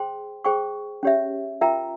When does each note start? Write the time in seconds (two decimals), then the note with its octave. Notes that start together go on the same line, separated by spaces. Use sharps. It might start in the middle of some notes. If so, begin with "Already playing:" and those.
Already playing: G#4 C5 G5 C6
0.44 G#4 C5 G5 C#6
1.03 C#4 G4 C#5 E5
1.61 F4 A#4 E5 G5 A#5